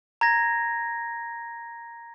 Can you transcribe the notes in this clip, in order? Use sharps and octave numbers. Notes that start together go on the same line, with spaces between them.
A#5 G#6 A#6